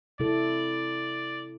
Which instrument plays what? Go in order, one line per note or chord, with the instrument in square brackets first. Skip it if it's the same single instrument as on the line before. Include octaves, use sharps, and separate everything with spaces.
[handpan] C3 E4 A4 [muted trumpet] D5